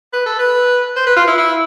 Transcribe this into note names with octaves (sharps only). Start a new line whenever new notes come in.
B4
A4
B4
C5
B4
F4
E4
E4